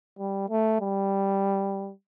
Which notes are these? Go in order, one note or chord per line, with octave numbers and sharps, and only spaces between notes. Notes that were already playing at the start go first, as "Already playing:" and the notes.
G3
A3
G3